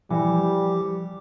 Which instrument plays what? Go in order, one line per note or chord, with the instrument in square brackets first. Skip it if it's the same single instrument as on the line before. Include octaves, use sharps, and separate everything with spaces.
[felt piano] E3 [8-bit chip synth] F3 G4 D6 [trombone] G3